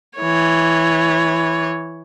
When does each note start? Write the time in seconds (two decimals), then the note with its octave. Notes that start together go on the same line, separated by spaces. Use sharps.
0.18 E3 C#5